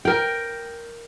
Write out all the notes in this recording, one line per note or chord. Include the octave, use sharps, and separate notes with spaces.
A#4 G5